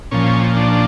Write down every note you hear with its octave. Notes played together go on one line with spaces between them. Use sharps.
A#2 F3 C#4
D4